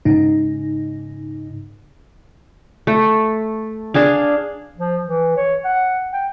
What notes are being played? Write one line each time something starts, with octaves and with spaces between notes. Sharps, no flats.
G#2 C#3 D#4
A3
D4 G#4 F5
F3
E3
C#5
F#5
G5